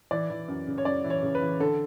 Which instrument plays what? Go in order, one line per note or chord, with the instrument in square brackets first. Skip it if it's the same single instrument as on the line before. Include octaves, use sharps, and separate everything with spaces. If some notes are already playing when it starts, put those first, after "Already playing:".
[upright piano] E3 D5
E3
F#2
C#3
C#5
F#2 D5
E3
C#5
C#3
B4
E3
D3 A4